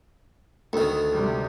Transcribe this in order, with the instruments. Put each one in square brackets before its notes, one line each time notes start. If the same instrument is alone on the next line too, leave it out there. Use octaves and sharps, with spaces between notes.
[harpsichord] D2 D#3 [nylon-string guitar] A4
[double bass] C3 G3